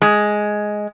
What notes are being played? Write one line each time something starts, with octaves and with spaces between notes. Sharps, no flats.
G#3